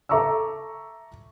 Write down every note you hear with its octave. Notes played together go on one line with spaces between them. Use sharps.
A4 E5 A#5 C#6 D6 E6